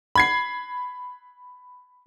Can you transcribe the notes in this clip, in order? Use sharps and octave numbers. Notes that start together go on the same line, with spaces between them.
B5 G#6 C7